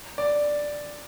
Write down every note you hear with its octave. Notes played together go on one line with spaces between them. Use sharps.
D5